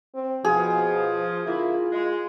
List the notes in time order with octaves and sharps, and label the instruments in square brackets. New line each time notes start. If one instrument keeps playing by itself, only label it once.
[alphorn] C4
[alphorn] B2 [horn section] F3 [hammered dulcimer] G#4
[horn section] D3 A#3 E4 [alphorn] F4
[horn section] G#3